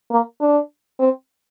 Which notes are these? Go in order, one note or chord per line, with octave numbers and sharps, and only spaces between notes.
A#3
D4
C4